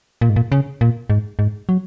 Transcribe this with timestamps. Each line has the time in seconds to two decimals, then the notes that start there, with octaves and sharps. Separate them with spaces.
0.21 A#2
0.29 G#2
0.36 A#2
0.52 C#3
0.81 A#2
1.10 G#2
1.39 G#2
1.69 F#3